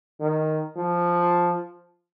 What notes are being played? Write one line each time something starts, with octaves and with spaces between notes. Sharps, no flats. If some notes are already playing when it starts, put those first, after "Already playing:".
D#3
F3